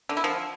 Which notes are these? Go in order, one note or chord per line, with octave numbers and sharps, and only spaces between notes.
D3
E4
F3